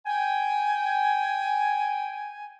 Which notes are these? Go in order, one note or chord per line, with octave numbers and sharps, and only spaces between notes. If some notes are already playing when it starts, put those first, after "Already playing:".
G5 G#5